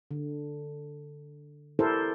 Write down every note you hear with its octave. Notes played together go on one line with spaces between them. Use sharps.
D3
E4 G4 A4 A#4 C5